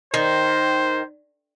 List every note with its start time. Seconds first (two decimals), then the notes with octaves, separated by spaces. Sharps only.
0.14 D#3 C5